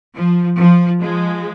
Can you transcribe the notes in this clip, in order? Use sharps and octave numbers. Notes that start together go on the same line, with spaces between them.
F3
F3
F3 G#3